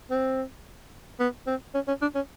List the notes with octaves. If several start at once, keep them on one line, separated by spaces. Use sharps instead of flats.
C4
B3
C4
C#4
C#4
D4
C#4